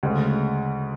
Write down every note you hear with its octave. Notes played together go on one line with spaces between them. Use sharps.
D2 C#3 G#3